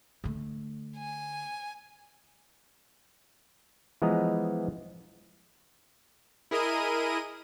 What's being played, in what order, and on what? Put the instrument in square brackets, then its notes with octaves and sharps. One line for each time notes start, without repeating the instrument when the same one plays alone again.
[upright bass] D3 A3
[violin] G#5
[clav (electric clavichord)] E3 F3 G#3 B3 D#5 A#5
[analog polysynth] E4 G#4 A#4 D#5 D#7